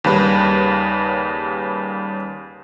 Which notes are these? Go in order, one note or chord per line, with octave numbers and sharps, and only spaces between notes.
D#2 C#3 G3 B4